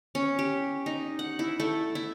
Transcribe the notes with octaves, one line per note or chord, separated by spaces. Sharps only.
C#4
G4
D#4
F#5
E4
A3
E4